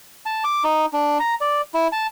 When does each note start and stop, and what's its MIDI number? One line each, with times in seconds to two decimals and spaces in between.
0.26 0.43 81
0.44 0.63 86
0.64 0.86 63
0.93 1.18 62
1.20 1.34 82
1.41 1.61 74
1.74 1.88 64
1.92 2.07 81